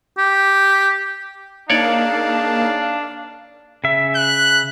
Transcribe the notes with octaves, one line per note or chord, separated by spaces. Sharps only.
G4
C#3 A#3 D4 D#4 C#5 D5 F5 A5
C#3 E5
F#6